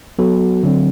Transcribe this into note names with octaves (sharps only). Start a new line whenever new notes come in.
F#3 B3 F#4 A4
D3 F#3 C4